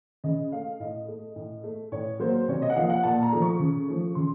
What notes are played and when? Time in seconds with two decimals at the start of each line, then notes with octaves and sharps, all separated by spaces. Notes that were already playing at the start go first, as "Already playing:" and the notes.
0.24 C#3 D#5
0.52 A3 F5
0.80 A2 D#5
1.08 A3
1.36 A2
1.64 A3
1.92 A2 C#5
2.19 F#3 A#3 C5
2.48 C3 C#5
2.62 D#5
2.70 F#5
2.76 F3 A#3 F5
2.90 F#5
3.03 A#2 A5
3.23 A#5
3.32 F3 A3
3.42 C#6
3.59 C#3
3.88 F3 A3
4.15 C#3 C6